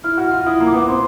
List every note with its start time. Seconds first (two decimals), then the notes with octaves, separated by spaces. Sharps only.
0.04 E4 F6
0.17 F#4
0.25 F6
0.31 F4
0.46 E4 D#6
0.60 A#3
0.67 D6
0.74 B3
0.88 C4 C6